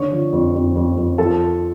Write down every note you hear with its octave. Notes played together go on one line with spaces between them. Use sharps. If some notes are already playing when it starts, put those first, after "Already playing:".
Already playing: D3 C#5 C#6
F3
F2
F2
F2
F2
F3 A4 A5